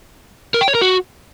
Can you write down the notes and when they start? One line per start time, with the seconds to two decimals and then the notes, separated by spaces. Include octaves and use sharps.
0.54 A#4
0.61 G5
0.68 C#5
0.75 A#4
0.81 F#4